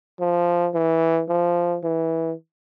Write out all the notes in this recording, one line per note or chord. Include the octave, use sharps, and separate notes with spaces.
F3
E3
F3
E3